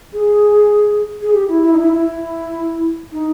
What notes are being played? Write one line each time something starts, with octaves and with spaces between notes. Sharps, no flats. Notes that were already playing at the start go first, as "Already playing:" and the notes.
G#4
G#4
G4
E4
E4
D#4
E4
E4
D#4